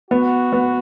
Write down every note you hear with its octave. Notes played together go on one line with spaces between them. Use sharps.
B3 F#4
B3